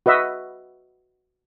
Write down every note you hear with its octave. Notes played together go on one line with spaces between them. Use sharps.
F#4 B4 D#5 E5